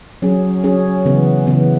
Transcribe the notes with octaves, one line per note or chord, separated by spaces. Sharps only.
F#3 C#4 G#4
F#3 C#4 G#4
C#3 E3 B3
C#3 E3 B3